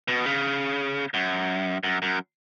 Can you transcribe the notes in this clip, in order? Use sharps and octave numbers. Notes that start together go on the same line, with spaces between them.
B2
C#3
F#2
F#2
F#2